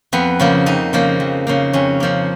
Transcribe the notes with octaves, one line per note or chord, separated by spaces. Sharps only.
F2 B3
C#3 F3 A#3
F2 D#4
C#3 F3 A#3
F2
C#3 F3 A#3
F2 C#4
C#3 F3 A#3